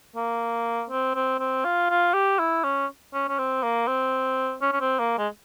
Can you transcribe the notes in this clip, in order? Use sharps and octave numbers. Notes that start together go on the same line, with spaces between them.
A#3
C4
C4
C4
F4
F4
G4
E4
C#4
C#4
C#4
C4
A#3
C4
C#4
C#4
C4
A#3
G#3